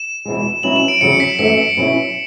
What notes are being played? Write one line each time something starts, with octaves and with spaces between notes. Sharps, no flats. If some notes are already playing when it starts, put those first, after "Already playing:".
Already playing: E7
E2 B2 G#3
B2 F#3 C#4 E4 F#7
E7
D7
E2 C#3 F#3 C#7
B6
F#2 E3 A3 B6
C#7
B2 F#3 C#4 E4